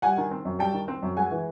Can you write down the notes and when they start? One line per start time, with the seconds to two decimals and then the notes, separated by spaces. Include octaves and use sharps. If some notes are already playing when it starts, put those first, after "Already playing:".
0.02 G3 F#5 G#5
0.17 D#3
0.31 C4
0.45 F#2
0.59 G3 G5 A5
0.73 D#3
0.88 C4
1.03 F#2
1.17 G#3 F#5 G#5
1.31 E3